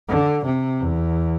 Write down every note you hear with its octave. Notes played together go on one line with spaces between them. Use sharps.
D3
C3
E2